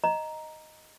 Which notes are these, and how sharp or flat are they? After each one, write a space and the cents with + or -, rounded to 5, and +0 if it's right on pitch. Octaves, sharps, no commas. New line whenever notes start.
D#5 +0 A#5 +5